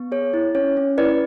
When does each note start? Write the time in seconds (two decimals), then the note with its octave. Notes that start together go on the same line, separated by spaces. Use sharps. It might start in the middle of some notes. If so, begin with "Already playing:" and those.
Already playing: B3
0.12 G#4 C#5
0.34 E4
0.55 C#4 C#5
0.77 C#4
0.98 E4 B4 D5